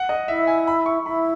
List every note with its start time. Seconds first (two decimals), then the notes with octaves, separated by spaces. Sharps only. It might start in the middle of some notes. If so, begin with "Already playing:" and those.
Already playing: F#5
0.09 D#5
0.28 E4 E5
0.47 G#5
0.67 B5
0.86 C#6
1.06 E4 B5